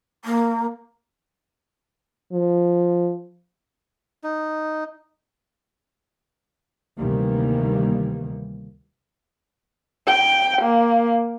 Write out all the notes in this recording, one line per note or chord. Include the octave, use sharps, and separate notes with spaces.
A#3
F3
D#4
D2 C3 D#3 E3 G3 A#3
G5
A#3